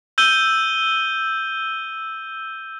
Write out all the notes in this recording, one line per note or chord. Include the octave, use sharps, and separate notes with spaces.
E6 G6 D#7 G7